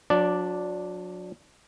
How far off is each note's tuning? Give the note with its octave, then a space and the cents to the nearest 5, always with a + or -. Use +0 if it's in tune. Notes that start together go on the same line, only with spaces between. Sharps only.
F#3 -35 D4 +0 D5 -5